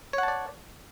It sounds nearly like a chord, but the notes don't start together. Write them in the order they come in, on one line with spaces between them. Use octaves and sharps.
C#5 F#5 A5 D5